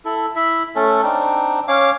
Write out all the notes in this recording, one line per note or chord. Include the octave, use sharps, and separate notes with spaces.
E4 A4
E4 E5
A3 C#4 A4
C4 D4 D#4
C#4 C#5 F5 D6